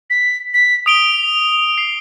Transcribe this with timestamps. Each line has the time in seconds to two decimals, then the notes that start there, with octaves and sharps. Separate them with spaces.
0.10 B6
0.54 B6
0.86 D#6 D7 F7 G7
1.78 C7